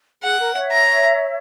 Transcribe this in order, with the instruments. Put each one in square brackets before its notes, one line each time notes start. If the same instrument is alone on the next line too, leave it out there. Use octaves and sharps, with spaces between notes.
[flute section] G#4 [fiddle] F#5
[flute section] A#4
C#5 E5
[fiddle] A#5